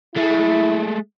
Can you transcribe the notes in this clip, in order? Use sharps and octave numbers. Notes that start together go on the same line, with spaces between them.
G#3 A3 E4